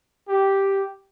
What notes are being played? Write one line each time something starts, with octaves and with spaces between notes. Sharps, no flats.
G4